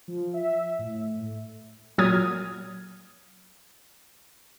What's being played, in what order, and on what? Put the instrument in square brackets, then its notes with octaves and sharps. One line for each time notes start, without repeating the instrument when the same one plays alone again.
[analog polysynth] F3
E5
A2
[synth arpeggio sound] A#2 F#3 D#6 F6 G#6